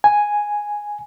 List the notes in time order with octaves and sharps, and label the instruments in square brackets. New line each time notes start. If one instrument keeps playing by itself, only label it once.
[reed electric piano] G#5